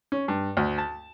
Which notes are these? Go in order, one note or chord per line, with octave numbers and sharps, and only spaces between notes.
C#4
G2
D2
A5